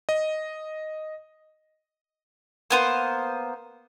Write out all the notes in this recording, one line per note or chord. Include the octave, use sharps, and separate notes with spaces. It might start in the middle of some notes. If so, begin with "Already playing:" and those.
D#5
A#3 B3 C5